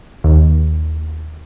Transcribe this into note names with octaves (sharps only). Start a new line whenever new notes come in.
D#2